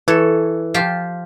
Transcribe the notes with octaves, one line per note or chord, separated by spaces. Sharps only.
E3 A4 C#5
F3 F4 G4